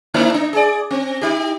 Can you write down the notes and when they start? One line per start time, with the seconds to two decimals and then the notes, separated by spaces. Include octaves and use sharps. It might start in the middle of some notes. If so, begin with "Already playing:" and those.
0.14 A3 D#4 E4
0.34 D4
0.53 G#4 D5
0.91 C4
1.21 D#4 G4